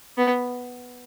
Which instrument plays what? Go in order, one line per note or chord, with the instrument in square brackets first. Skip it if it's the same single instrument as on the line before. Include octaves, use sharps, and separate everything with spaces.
[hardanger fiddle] B3